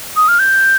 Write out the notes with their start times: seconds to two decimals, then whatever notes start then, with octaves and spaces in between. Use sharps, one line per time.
0.16 D#6
0.28 F6
0.39 G6